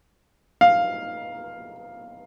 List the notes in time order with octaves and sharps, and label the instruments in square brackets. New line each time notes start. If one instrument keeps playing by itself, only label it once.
[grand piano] F5